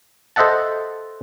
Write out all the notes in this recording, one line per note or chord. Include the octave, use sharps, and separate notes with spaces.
A4 C5 D#5 E5 F#5 A5